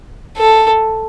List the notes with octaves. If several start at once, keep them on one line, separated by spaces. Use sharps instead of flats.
A4